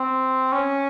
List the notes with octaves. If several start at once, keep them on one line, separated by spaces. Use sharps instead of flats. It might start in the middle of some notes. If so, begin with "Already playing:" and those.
Already playing: C4
C#4